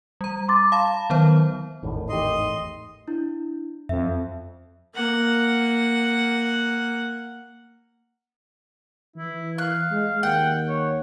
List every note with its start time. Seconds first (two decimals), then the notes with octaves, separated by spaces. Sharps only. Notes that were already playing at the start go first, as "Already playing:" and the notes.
0.21 G3 A#5
0.48 C6 D6 A6
0.72 F5 A5 B5
1.10 D#3 F#3 B3 C5
1.83 G#1 E2 A2 D#3
2.09 D#3 A3 G4 D#5 C6
3.08 D4 E4
3.89 F2 E5
4.95 A#3 F#5
9.16 E3 E4
9.58 F5 F#6
9.91 G#3
10.23 D#2 F#5 G5
10.68 C#5